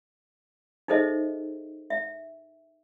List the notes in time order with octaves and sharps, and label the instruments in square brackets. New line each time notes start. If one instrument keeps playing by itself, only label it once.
[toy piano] D#4 G#4 A4 C5 D#5 E5
E5